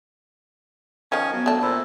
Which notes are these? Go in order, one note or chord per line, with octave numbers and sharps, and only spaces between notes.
D#3 F3 C#4
F#3 B3
A3 D4
A#2 C5 B5 E6